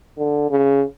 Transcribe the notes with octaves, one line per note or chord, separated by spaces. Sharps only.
D3
C#3